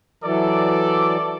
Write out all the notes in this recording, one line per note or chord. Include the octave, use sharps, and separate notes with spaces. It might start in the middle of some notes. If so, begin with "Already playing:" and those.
E3 F#3 A4 D5